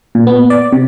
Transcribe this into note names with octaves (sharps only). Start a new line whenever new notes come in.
A#2
B3
D5
C3